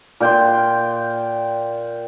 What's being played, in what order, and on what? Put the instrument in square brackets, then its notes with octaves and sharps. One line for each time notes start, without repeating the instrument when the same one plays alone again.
[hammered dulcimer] A#2 G5 C6